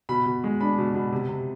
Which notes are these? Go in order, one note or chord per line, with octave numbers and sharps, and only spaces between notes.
B2 B5
B2
G#3
D4 B5
B2
B2
C3
C3